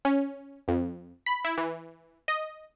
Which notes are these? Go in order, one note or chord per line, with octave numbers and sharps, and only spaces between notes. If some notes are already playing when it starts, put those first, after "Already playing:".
C#4
F2
B5
E4
E3
D#5